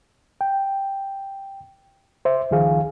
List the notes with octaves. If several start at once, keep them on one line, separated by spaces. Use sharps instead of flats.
G5
C5 E5
C#2 D#3 F3 G#4 F5